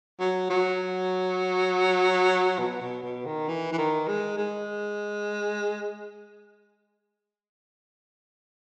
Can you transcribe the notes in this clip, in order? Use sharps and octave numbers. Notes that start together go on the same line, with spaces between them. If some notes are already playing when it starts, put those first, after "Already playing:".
F#3
F#3
B2
B2
B2
D#3
E3
E3
D#3
G#3
G#3